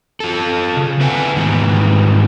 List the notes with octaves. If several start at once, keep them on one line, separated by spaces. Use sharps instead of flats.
F4 A4
C#3
C4 B4 E5 F#5 G#5
G#2 D#3 E3 B3